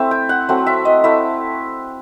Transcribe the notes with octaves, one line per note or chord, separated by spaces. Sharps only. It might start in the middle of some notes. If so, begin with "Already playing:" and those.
Already playing: A3 C4 E4 E5
G5
F#5
F#3 A3 C4
E5
D#5
A3 E4 E5